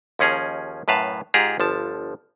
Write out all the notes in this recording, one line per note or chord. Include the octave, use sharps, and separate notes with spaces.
D#2 F3 C#4 G#4 A#5
F#2 A2 B4 F5 A5
G#2 F4 G4 G#4 A#5
G1 F3 A5